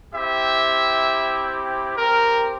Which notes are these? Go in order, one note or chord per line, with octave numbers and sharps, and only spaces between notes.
C4 E4 G4 E5
C4 G4 A#4